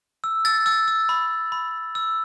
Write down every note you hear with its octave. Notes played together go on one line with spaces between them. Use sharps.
E6
E6 A6
E6 A6
E6
B5
B5
E6